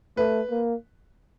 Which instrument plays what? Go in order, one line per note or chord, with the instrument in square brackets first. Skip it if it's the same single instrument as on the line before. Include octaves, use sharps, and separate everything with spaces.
[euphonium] A3 [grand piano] B4
[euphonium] A#3